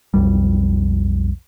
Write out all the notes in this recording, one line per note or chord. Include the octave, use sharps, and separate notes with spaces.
B1 F2 G3